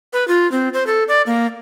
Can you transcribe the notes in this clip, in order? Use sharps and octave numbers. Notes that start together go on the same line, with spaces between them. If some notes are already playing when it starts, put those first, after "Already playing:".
B4
F4
C4
C5
A4
D5
A#3